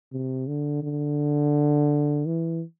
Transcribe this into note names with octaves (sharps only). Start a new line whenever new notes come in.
C3
D3
D3
E3